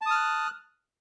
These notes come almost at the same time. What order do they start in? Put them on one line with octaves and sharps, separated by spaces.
A5 D#6 F6 F#6